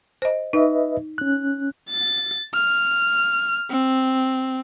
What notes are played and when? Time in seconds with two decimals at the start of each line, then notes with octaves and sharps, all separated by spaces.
0.22 C5 D#5
0.53 D#4 B4 D#5 E5
1.18 C#4 F#6
1.89 A6
2.54 F6
3.70 C4